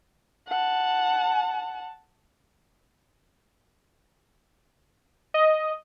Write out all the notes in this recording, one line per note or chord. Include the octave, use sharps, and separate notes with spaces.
F#5 A5
D#5